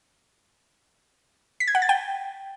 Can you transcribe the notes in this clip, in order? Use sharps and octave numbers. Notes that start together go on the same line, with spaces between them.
B6
G#6
F#5
A6
G5